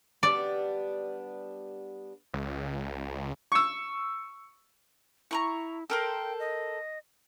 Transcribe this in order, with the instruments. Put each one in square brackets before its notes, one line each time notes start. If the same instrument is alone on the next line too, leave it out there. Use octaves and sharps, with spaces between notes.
[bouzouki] G3 B3 D4 [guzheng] D5
[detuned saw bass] C#2
[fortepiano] C#6 E6
[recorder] E4 [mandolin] A#5 B5 C#6
[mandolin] A4 A#4 C5 [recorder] G5
[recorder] D#5